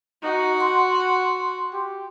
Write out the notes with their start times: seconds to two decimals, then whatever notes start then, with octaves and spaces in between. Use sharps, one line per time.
0.23 D#4 F#4
0.61 F#5 C6
1.73 G4